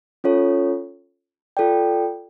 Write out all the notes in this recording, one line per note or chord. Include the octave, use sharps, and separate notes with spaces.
C#4 F4 A4 C#5
F4 A4 D5 G5